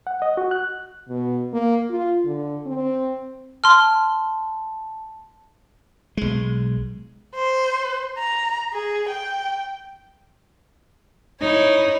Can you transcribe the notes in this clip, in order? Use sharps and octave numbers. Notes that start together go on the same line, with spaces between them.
F#5
D#5
F#4
F#6
B2
A#3
F4
D3
C4
A5 C6 F6
B1 G#3
C5
A#5
G#4
G5
D#4 E4 C#5